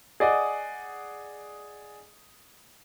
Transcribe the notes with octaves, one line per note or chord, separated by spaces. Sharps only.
G#4 D5 D#5 F#5